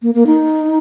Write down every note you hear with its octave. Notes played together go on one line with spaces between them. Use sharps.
A#3
A#3
D#4